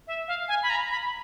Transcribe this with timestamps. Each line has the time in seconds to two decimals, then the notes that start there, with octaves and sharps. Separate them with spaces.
0.07 E5
0.28 F5
0.48 G#5
0.63 B5
0.70 A#5
0.90 B5